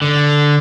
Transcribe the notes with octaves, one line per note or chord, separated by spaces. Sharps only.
D3